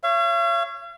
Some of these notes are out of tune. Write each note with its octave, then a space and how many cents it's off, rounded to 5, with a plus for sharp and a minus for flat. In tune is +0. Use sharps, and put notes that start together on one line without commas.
C#5 -5 F5 -45